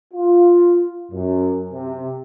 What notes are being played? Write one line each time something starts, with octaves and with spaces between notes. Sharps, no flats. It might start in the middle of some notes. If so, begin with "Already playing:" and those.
F4
F#2
C3